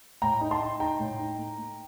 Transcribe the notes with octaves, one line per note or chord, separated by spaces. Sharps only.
A2 G5 A#5
D#4
A5 C6
D#4
D#4 G5 A#5
A2
D#4
A3
A3